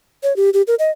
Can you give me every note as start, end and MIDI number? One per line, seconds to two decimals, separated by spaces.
0.23 0.35 73
0.36 0.50 67
0.53 0.62 67
0.67 0.75 70
0.79 0.91 75